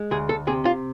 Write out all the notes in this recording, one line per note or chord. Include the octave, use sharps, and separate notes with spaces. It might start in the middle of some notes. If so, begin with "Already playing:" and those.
Already playing: G#3
D2 G#4
A4
C3 G#4
F4